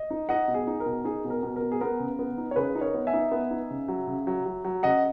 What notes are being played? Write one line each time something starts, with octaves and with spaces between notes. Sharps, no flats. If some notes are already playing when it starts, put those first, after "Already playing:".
Already playing: D#5
D#4
D#4 D#5 F#5
B2
G#4
D#4
A#4
B2
D#4 G#4
B2
A#4
B2
A#4
B2
G#4
B3 A#4
C#3
B3
D#4
C#5
C#3 G#4 B4
D#4
A#4 C#5
B3
E5 G#5
D#4
B3
D#4
C#3
F#3
C#3
F#3
F#3
F#3
C#3 D#5 F#5